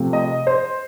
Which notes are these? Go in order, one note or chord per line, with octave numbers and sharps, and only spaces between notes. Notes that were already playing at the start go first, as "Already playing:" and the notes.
Already playing: C3 F3 A3 C4
D#5
C5